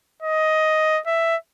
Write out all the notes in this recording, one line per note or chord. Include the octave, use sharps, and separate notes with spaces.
D#5
E5